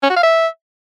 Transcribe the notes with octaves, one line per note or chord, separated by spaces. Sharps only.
C#4
F#4
F5
E5